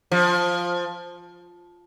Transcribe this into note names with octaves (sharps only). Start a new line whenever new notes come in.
F3